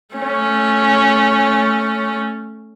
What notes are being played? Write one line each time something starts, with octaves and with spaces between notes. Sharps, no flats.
A3 C#4